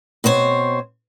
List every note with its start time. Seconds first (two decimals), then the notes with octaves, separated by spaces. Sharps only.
0.24 B2 C4 C5 C#5